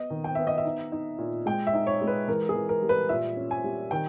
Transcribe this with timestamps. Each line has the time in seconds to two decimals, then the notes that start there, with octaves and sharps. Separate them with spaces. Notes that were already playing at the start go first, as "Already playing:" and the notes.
Already playing: B3 D#5
0.10 D#3
0.24 G5
0.35 B3 E5
0.47 D#5
0.58 E5
0.65 D#4
0.92 D#4
1.18 A#2
1.46 G#3 G5
1.67 E5
1.74 D#4
1.87 C#5
2.01 G#3
2.07 B4
2.28 E3 A#4
2.49 G#4
2.55 E3
2.69 A#4
2.82 G3
2.89 B4
3.09 A#2 E5
3.36 C#4
3.51 G#5
3.64 G3
3.91 D#3 G5